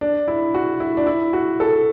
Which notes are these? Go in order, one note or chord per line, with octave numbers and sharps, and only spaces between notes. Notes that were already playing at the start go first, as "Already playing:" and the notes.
D4
E4
F#4
E4
D4
E4
F#4
A4